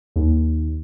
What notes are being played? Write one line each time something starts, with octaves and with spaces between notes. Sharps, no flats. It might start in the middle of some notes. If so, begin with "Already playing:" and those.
D#2